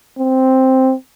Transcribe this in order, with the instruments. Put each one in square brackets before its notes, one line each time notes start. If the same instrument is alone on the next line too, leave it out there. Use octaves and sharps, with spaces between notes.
[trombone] C4